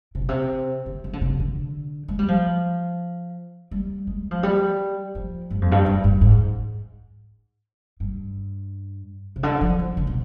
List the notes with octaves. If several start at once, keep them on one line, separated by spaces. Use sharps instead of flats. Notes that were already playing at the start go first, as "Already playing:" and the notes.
C3
B2
C3
D3
D#3
D3
C3
D3
G#3
G3
F3
G3
G#3
F3
G3
F3
G2
F2
G2
G2
G2
G#2
G2
C3
D3
F3
F3
D3
B2